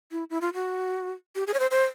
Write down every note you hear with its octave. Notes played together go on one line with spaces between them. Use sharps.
E4
E4
F4
F#4
G4
G#4
C#5
C5
C5